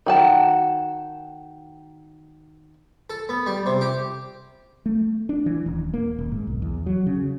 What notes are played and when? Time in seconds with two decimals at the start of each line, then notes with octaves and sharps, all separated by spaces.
0.06 D#3 F#4 A5
3.10 A4
3.29 B3
3.47 G3
3.66 C3
3.81 G4
4.86 A3
5.29 D4
5.46 E3
5.66 D#1
5.94 A#3
6.19 D#1
6.32 G#2
6.47 B1
6.62 E2
6.86 F#3
7.06 C#3